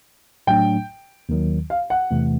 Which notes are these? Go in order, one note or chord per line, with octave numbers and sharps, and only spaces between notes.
A2 F#3 A3 D4 G5
D#2 D#3 F#3
F5
F#5
E2 C3 E3 A3